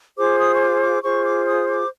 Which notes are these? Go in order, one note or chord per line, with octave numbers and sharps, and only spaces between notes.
F4 G#4 C5 D6
D#6
C#6
D6
D6
F4 G#4 C5 C#6
D6
D#6
D6